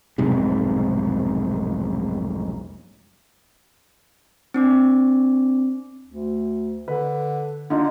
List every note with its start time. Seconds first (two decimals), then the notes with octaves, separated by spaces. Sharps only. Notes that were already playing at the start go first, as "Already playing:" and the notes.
0.18 F1 B1 G#2 C3
4.54 C4 D4 D6
6.06 D2
6.88 D3 B4
7.70 D3 D#4 F4